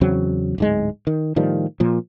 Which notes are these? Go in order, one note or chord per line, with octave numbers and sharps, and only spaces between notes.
E2 C#3 F#3 C4
D1 G#2 G#3
D#3
A2 D#3 F3 G3
A#2 F3